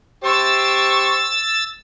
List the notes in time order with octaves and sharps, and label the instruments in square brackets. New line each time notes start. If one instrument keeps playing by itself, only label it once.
[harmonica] G4 C5 [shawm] C#6 [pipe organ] E6 A6